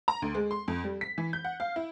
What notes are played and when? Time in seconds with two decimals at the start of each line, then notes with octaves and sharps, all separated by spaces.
0.08 A#5
0.22 D2
0.35 G#3
0.51 C6
0.68 F2
0.84 G3
1.01 B6
1.18 E3
1.33 G6
1.44 F#5
1.60 F5
1.76 E4